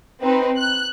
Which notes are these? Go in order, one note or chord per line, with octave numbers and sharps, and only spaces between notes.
C4 D#4 B4
F#6